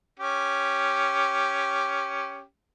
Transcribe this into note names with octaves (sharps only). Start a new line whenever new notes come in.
C#4 G4